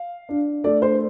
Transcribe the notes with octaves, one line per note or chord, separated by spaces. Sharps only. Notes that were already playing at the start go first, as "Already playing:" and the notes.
Already playing: F5
D4
A3 D5
C5